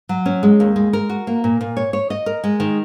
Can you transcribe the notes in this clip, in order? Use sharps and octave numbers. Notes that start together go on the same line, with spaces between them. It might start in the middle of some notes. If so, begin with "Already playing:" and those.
F#3
C#4
G#3
D#2
G#3
A#4
F#4
A#3
A#2
A#2
C#5
C#5
D#5
A#4
G#3
D#3